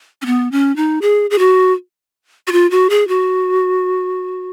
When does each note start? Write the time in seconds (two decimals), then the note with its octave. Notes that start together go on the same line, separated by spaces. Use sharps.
0.22 C#4
0.26 B3
0.52 C#4
0.76 D#4
1.02 G#4
1.30 G#4
1.38 F#4
2.47 F#4
2.52 F4
2.71 F#4
2.90 G#4
3.08 F#4